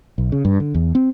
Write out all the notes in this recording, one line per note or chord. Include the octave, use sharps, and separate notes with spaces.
B1
C#3
G2
D3
E2
C4